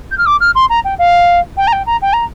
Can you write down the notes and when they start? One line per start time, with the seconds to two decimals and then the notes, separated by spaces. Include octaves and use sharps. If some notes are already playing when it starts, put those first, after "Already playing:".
0.11 G6
0.18 F6
0.26 D6
0.40 F6
0.55 C6
0.70 A#5
0.84 G5
0.99 F5
1.57 G5
1.67 A#5
1.72 G5
1.86 A#5
2.02 G5
2.13 A#5